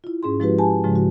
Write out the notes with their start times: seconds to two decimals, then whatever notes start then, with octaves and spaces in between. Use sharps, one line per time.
0.04 E4 F4
0.23 G#2 C#4 G#4 C6
0.40 F3 G#3 E4 F#4 G4 B4
0.58 G4 G#5 A5
0.84 G#2 C#3 F3 G#3
0.96 F#4